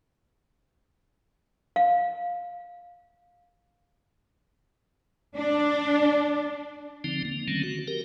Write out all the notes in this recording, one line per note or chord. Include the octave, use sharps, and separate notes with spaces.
F5
D4
D3 F3 C4 D#4
A#3
D3 D#3 F#3 A3 C4 C#4
F#4
G4 A#4